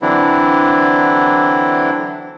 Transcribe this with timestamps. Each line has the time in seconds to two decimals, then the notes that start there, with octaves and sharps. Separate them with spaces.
0.02 D3 E3 F#3 C4 D4 E4